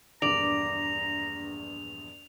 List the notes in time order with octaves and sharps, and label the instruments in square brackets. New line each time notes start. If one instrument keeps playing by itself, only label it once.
[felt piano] A#1 E2 G2 [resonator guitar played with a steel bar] D5 [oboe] A#5 [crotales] F7